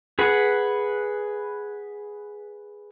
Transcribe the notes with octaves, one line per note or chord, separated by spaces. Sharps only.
G#4 B4 F#5